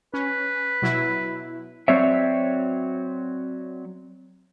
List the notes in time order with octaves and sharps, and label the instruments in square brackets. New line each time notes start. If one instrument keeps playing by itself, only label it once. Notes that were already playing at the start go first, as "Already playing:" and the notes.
[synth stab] C#4 [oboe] B4
[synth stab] B2 F#3 E4
[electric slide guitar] F#3 C4 F#4 C#5 D5 E5